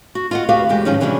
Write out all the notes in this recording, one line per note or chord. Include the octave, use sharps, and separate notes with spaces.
F#4
F4 D#5 F#5
D2 F#4 G4 B4 F5
E2 G#3 G4
G#2 D#3 F3 G#3 C#4 D#4
C3 E3 F#3 C#4 D4 G#4